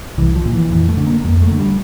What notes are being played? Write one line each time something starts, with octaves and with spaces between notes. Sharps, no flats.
C2 E3
F3
A#2
E3
F2 E3
A3
D3
A#3
F2 A#3
A3
D3
G3